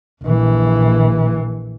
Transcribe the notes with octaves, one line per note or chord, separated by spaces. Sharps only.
A#1 E3